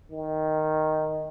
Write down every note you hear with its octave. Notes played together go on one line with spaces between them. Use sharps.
D#3